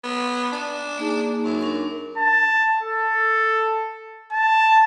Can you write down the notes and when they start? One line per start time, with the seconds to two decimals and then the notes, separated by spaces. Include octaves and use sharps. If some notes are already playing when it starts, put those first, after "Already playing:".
0.04 B3
0.52 D4
0.98 A#3 D#4 G#4
1.43 F#2
1.61 D4 A#4 C#6
2.17 A5
2.83 A4
4.32 A5